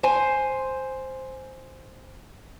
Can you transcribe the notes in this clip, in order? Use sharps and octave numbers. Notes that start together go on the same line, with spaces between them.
C5 G#5